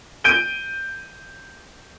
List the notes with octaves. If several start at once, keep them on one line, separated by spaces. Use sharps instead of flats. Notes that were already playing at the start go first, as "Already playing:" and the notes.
G6 D7 D#7 G7